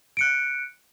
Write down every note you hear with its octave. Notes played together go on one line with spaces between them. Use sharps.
F#6 C#7 D7